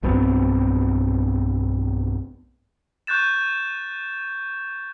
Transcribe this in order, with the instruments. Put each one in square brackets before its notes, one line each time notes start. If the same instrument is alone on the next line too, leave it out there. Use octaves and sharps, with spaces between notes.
[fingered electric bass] B1 G2 B3 C4
[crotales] C#6 F#6 G6 A6 E7